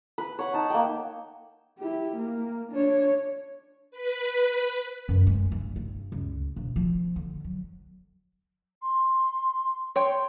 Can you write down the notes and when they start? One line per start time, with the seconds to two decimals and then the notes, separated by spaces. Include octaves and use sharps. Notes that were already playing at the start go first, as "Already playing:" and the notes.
0.18 B4
0.39 C#5 F#5
0.54 D#4 A5
0.70 A#3 G5
1.79 E4 G4
2.17 A#3
2.71 D4 C#5
3.91 B4 B6
5.09 F#2
5.27 G#3
5.52 G2
5.76 G2
6.12 C#2
6.56 E1
6.76 F3
7.16 D3
7.44 F#3
8.82 C6
9.96 C#5 G5 C6